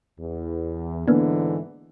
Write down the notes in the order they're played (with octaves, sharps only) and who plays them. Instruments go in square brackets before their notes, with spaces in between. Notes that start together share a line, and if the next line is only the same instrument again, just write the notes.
[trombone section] E2
[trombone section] G#2 D3 E3 [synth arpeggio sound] A#3 B3 D4